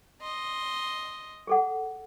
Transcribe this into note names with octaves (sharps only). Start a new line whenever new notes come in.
D#5 C6
G#4 A4 F#5